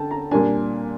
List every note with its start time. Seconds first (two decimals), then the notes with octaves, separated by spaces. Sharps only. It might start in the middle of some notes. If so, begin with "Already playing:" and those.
Already playing: D3 G5 A5
0.11 A#5
0.31 A#2 G3 A#3 D4 G#5